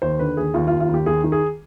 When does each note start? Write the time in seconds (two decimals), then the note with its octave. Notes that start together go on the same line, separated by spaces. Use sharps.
0.02 D#2 C5
0.19 D3 B4
0.37 D#2 G#4
0.54 D#2 F4
0.67 F4
0.72 D#2
0.80 F4
0.89 D#2
0.94 G4
1.06 D#2 G#4
1.24 D#3
1.32 G#4